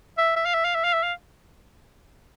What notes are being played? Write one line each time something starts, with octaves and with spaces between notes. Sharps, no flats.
E5
E5
F5
E5
F5
E5
F5
E5
F5